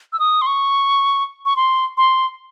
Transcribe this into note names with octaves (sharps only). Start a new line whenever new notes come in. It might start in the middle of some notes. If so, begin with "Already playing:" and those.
E6
D#6
C6
C#6
C#6
C6
C6